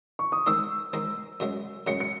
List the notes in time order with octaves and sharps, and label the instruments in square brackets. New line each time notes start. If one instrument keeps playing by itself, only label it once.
[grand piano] C#6
D#6
[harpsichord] D#3 G#3 C4 D#4 [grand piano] E6
[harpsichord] D#3 G#3 C4 D#4
F#2 C#3 G#3
[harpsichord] F#2 C#3 G#3 [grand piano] C#7
[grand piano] C#7